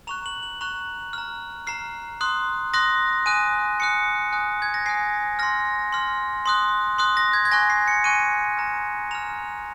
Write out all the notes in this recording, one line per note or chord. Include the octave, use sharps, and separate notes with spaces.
A#5 C#6 F#6 F7
F#7
F#7
A#5 C#6 F#6 F7
A#5 F6
A#5 F6 C7
C6 D#6 F#6
C6 D#6 F#6 A#6
G#5 D#6 F#6 D#7
G#5 D#6 F#6 C#7
G#5 D#6 F#6
G#6
A#6
G#5 D#6 F#6 C7
C6 F6 A#6
C6 F6
C6 D#6 F#6
C6 D#6 F#6
A#6
G#6
G#6
G#5 C#6 F#6 A#6
C7
C#7
G#5 C#6 F#6 D#7
A#5 F6
A#5 F6 F7